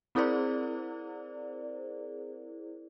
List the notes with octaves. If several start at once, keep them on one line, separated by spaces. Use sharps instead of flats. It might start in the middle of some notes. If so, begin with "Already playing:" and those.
C4 E4 G#4 A#4 C5 D5